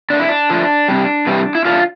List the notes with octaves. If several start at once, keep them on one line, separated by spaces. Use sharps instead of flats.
D3 A3 D4
E4
D4
D3 F3 A3
C3 G3
C3 E3 G3
E4
D3 A3 F4